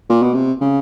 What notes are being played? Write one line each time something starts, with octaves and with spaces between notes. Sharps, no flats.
A#2
B2
C3
C#3